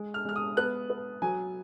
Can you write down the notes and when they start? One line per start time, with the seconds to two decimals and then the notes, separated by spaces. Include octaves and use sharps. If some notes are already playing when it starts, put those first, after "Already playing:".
Already playing: G#3
0.14 F6
0.25 G#3 F6
0.36 D#6
0.57 B3 F#6
0.90 B3
1.22 F#3 G#5